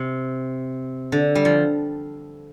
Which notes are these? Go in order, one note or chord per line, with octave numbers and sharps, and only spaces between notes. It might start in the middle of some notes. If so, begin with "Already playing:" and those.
Already playing: C3
D3
G3
F3